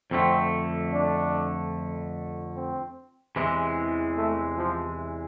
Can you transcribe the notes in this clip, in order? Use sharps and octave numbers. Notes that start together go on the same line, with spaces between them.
F2 D3 A3 C4
D4
C4
E2 C3 E3 G#3
A3
F3